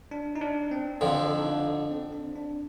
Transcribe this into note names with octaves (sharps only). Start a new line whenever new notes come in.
D4
D#4
D4
C4
F2 D3 F3 D4
D#4
D4
C4
D4
D4